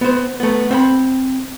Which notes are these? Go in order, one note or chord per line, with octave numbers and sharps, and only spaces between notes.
B3 C5
A3 B3
C4 F#5 B5